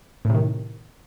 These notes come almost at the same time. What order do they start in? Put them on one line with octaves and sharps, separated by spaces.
A2 C3 D#3